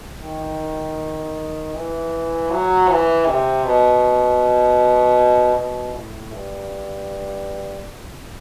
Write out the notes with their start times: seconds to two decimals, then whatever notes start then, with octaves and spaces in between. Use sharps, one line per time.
0.22 D#3
1.75 E3
2.51 F#3
2.90 E3
3.27 C3
3.65 B2
5.55 B2
5.93 A2
6.32 G2